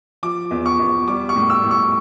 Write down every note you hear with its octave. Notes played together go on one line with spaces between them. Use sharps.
F3 D6
E2
C#6
E2
G3 D6
C#6
A2
E6
A2
C#6